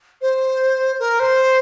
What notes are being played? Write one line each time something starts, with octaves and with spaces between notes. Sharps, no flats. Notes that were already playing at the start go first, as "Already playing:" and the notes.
C5
A#4
C5